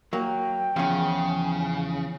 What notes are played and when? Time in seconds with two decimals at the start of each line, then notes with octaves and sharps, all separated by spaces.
0.13 F#3 A#3 G5
0.76 E2 C#3 F3 C#4